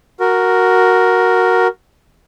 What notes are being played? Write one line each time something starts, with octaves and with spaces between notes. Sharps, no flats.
F#4 A#4